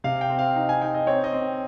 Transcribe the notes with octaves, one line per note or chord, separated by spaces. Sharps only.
C3 F5
G5
C4
F5
D#4
G#5
D#4 G5
D#5
C4 C#5
D#5
C4
G5